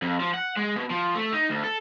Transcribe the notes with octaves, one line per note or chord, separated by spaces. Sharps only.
F2
F3
F#5
G#3
B2
F3
A3
D#4
D2
A4